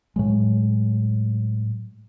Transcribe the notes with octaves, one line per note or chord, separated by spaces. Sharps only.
A2 F#3 G#3